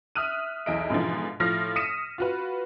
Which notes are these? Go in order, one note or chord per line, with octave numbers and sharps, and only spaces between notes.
E5 D#6 F6 F#6 D#7
B1 E2 E4 D#5 E5 D7
G#2 B2 D3 E3 F3
A2 F3 F6 A#6
D#6 B6 C#7 D#7 E7
F4 F#4 B4